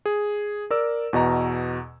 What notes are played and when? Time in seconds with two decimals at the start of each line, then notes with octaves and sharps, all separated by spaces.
0.06 G#4
0.71 A#4 D5 E6
1.13 E2 B2 D#5 A#5